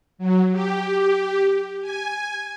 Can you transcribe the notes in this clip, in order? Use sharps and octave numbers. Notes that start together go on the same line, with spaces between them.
F#3
G4
G#5